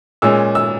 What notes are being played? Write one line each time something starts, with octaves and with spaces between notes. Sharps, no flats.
A#2 G#3 C#4 E6
E6